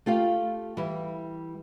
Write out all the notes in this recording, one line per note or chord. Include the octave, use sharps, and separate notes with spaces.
A3 F4 G4 F5
E3 G3